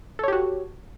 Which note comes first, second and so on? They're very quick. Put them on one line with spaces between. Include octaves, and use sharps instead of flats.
A4 C#5 G4 F#4